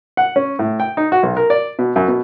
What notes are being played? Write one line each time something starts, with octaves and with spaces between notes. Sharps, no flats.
F#5
C#4
A2
G5
D#4
F#4
B1
A#4
D5
B2
F#2
B2